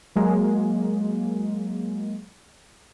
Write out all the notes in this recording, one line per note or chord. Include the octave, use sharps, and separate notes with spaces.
F#3 G#3 A#3